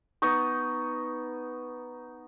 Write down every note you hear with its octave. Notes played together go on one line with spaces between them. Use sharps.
B3 D#4 C#6